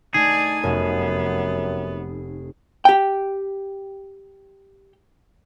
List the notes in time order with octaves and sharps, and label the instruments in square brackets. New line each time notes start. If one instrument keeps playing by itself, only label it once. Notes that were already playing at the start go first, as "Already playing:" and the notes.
[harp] A3 D#4 [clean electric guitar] G#4 [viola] D5 G#5
[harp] F1 [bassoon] F#2 [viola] B3
[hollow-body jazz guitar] G4 G5